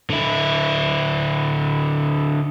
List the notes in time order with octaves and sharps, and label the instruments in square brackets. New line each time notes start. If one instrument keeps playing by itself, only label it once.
[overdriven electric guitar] D3 E4